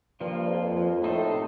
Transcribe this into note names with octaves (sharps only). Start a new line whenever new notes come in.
G2 F3 A#3 F4
F2
F2
A2 A3 D#4 A4 C5
C3